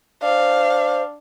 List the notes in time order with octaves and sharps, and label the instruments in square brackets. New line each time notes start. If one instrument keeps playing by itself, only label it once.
[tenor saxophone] D4 [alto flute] C5 [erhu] F5